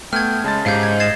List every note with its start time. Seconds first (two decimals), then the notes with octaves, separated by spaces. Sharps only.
0.13 A3 B3 G5 F6 G#6
0.44 C#3 G#3 A5 A6
0.66 G#2 G4 F5 G6
0.83 G#6
1.00 D#5 G#6 A6 C7 E7